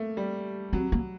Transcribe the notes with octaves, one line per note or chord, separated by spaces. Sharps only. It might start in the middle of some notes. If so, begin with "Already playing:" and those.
Already playing: A3 A#3
G3
F#3 C4
A#3